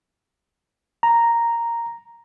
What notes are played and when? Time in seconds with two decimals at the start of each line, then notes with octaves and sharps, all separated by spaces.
1.03 A#5